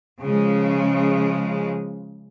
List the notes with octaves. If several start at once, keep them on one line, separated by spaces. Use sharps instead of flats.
C#3 F3 G#3